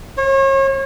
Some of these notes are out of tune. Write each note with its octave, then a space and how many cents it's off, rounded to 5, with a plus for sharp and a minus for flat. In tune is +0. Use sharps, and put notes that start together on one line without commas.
C#5 -40